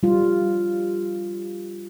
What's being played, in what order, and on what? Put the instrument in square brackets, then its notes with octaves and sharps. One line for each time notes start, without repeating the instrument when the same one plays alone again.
[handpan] G3 F4